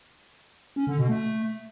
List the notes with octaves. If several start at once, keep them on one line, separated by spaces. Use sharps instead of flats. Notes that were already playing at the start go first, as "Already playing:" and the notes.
C#4
D3
B2
A3